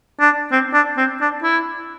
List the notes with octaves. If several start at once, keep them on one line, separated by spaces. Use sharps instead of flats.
D4
C4
D4
C4
D4
E4